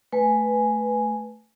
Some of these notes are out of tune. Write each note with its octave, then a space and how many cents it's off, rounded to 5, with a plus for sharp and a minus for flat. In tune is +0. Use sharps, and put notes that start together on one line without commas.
A3 +0 B4 +0 G#5 +0